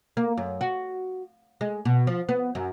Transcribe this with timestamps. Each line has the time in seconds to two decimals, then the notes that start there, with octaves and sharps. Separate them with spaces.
0.17 A#3
0.37 F#2
0.61 F#4
1.61 G#3
1.85 B2
2.07 F3
2.29 B3
2.55 F#2